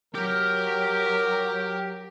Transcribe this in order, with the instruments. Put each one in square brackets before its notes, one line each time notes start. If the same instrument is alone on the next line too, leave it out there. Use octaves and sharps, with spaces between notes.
[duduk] F#3 [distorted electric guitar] G4 G5 [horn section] A#4